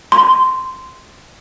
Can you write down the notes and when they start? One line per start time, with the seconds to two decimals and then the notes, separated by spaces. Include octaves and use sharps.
0.12 C6